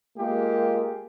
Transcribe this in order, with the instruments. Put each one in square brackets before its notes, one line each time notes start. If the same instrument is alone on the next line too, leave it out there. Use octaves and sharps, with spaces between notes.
[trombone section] G#3 F4 G4 [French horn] A#3